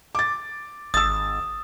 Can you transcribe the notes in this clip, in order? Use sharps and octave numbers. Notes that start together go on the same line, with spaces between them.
D6 A6
G#1 D#6 E6 A6